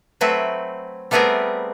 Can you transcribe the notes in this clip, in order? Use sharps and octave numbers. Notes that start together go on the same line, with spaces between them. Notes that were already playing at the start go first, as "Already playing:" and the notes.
F#3 A3 C4 B4 E5
G3 A3 B3 C4 G#4 A#4